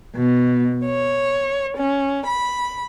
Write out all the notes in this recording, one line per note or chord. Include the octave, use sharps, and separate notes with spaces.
B2
C#5
C#4
B5